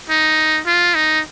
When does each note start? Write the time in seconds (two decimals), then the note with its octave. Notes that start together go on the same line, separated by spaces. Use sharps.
0.10 D#4
0.66 F4
0.95 D#4